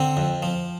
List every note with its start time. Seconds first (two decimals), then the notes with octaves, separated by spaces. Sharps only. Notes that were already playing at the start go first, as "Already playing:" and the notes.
Already playing: D3 C4
0.17 F2
0.43 F3